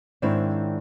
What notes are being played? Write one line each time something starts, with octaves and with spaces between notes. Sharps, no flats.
G#2 D#3 C4 D4 E4 C#5